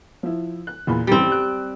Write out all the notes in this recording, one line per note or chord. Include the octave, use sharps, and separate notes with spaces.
F3 E4
F#6
E2 A#2 B5
A1 F2 G3 C4
F#6